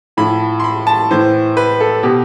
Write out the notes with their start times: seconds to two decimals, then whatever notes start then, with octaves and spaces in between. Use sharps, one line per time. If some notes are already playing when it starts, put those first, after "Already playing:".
0.17 A2 F3 B5
0.60 C6
0.64 B5
0.87 A5
1.10 A2 E3 C5
1.57 B4
1.80 A4
2.03 B2 G4